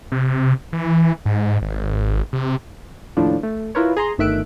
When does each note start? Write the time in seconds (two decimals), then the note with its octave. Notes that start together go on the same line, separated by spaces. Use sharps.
0.12 C3
0.73 E3
1.25 G#2
1.62 G#1
2.33 C3
3.17 D#2 A2 F3 D4
3.43 A3
3.75 E4 F4 A#4 B4 C#5
3.97 G#4 A#5 C6
4.18 G1 D#3 A3 E5 F#6 D7